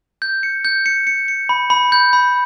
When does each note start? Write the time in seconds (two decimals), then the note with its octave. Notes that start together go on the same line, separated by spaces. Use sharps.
0.22 G6
0.43 C#7
0.65 G6
0.86 C#7
1.07 C#7
1.28 C#7
1.49 B5
1.70 B5
1.92 G6
2.13 B5